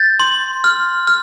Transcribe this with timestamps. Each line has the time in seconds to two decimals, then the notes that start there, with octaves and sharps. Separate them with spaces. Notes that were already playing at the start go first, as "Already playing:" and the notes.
Already playing: G6 A6
0.20 C6
0.64 F6
1.07 F6